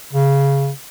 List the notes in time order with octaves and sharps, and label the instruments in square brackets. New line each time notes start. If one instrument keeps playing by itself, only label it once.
[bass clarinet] C#3